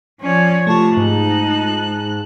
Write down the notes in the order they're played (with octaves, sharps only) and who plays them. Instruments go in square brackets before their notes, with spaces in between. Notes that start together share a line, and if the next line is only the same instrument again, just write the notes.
[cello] F3 C#5 [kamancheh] C#4 D5
[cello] C3 [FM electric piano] A3 F4 [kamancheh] A5 C#6
[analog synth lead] G#2 [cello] D#4 [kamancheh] A5 F#6